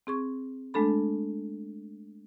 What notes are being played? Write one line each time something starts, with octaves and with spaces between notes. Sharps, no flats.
C4 G#4 C#6
G#3 A3 D4 A4 B5